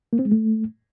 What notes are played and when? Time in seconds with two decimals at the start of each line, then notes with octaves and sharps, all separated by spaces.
0.13 A#3
0.19 C4
0.25 G#3
0.32 A3